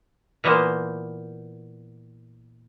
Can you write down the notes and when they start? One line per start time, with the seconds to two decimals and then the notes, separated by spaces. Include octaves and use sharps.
0.44 A#2 E3 A#3 B3 C5